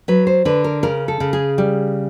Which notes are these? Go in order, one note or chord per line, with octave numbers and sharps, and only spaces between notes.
F#3 B4
C5
D3 B4
A#4
C#3 A#4
A4
C#3
G#4
G3